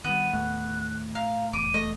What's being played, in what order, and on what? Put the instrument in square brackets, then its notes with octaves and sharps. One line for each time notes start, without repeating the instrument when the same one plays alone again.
[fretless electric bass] D#3 G3 [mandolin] B3 [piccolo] D#7
[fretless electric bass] D#2 [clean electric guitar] A2 [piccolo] F#6
[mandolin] F5 [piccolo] A#5
[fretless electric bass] F1 E2 [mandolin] D6 [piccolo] D#7
[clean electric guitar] A3 [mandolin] D#5